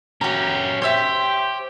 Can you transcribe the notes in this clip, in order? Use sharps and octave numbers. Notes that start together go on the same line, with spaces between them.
C#4 F#4 G4 A#5
G4 C5 C#5 E5 G5